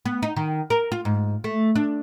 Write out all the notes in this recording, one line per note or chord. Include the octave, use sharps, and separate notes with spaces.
B3
D#4
D#3
A#4
F4
G#2
A3
D4